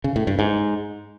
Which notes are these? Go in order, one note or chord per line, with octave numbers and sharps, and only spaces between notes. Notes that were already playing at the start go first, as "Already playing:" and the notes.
C#3
A2
G2
G#2